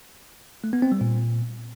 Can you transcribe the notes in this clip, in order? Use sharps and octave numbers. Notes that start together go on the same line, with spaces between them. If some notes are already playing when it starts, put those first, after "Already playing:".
A3
B3
C4
G3
A#2